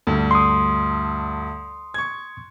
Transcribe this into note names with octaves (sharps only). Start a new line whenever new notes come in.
D2 G2
C6 D#6
C#6 G#6